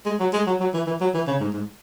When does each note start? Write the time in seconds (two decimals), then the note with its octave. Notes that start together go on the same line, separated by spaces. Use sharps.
0.06 G#3
0.20 F#3
0.33 G#3
0.47 F#3
0.60 F#3
0.74 E3
0.87 E3
1.01 F#3
1.14 E3
1.28 C#3
1.41 G#2
1.54 G#2